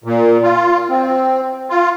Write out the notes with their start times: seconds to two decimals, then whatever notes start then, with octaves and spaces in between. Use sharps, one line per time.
0.04 A#2
0.43 F4
0.90 C4
1.70 F4